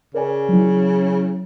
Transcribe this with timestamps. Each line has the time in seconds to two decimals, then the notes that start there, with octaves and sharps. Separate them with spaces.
0.14 C#3 A#4 D5 G#5
0.49 F#3 E4